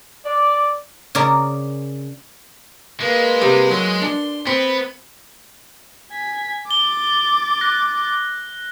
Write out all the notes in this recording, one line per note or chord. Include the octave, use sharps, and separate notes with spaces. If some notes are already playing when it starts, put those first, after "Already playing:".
D5
C#3 A#4 D5
G#3 A#3 B4
C3 G3
F#3 C6
D4
B3 C4
G#5 B6
D6 A6 G7
F#6 A#6